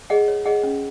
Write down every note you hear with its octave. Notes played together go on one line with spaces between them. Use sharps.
G#4 D#5 F#5
C#5
G#4 D#5 F#5
C#4